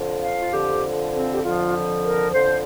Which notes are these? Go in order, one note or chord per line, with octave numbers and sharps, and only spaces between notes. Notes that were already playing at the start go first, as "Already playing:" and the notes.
Already playing: F2 D3 F3
F5
F4
F2 D3 F3 G4
C4
G4
F2 D3 F3 F4
A#4
F2 D3 F3 C5